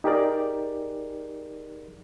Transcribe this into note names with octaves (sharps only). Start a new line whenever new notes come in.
D#4 G4 G#4 A#4 D5